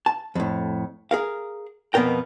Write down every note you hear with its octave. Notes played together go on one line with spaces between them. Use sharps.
A5
F2 A2
G#4 A#4 F5
F2 B2 B3 A#4 G5